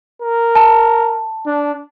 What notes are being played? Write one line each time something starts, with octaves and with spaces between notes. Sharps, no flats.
A#4
A5
D4